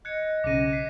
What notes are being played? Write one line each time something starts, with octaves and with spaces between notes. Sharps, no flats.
D#5 F#6 G#6 C#7
B1 C#3 D6 A#6 D#7
B6 C7